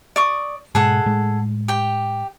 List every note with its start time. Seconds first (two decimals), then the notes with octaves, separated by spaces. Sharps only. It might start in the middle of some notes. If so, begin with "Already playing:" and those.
0.16 D5 C#6 D#6
0.75 G#2 B2 G#3 G#4 A4 F#5
1.06 A2 G#3
1.68 G4 G5